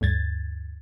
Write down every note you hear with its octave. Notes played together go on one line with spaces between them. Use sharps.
D2 G2 G#6 A6